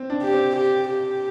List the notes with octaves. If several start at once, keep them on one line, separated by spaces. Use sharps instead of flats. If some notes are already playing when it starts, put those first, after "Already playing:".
Already playing: C4
D4
G4
C4
G4
G4